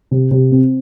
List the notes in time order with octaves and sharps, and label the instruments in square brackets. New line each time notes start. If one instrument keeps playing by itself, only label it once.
[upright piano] C3
C3
C4